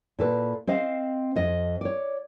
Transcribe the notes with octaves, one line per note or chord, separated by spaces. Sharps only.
A#2 A4 B4
C4 C5 D#5 F5
F2 D#5
C#5 D5